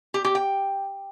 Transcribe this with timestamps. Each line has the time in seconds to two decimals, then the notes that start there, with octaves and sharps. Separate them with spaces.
0.14 G4
0.25 G4
0.35 G5